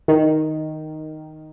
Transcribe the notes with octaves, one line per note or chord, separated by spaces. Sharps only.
D#3